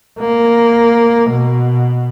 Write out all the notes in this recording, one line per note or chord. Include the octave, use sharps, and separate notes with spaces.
A#3
B2